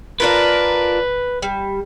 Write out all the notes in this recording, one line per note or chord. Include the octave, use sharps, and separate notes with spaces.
D4 F4 A#4 B4
G3